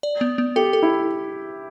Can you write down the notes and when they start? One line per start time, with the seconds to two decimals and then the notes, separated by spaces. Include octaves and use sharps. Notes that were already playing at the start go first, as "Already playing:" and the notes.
0.03 D5
0.21 B3
0.38 B3
0.56 G4 A4
0.73 A4
0.82 E4